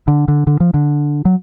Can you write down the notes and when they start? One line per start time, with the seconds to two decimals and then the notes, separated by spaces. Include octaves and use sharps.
0.08 D3
0.28 D3
0.47 D3
0.60 F3
0.74 D3
1.25 F#3